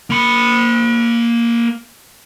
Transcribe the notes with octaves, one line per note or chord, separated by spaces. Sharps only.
A#3 B5